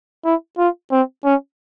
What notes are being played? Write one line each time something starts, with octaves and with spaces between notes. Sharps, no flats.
E4
F4
C4
C#4